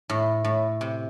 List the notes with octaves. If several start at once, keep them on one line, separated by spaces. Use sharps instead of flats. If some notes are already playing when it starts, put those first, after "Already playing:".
A2
A2
C3